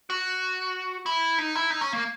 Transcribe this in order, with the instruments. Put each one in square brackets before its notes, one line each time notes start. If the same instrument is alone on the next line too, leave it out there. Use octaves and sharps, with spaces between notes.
[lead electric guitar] F#4
E4
D#4
E4
D#4
C#4
A#3